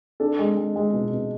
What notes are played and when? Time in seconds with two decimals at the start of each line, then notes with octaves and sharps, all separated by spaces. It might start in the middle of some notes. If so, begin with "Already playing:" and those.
0.20 D4 A4
0.39 G#3
0.57 G#3
0.76 G#3
0.94 B2
1.12 B2